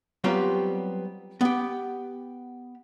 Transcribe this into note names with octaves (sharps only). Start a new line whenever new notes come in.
F#3 G3 B3 C4 F4 G4
B3 G4